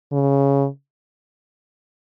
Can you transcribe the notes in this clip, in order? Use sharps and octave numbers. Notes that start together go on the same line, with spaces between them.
C#3